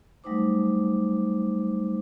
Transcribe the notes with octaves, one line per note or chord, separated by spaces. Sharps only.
F#3 G3 A3 D#4 C5 D6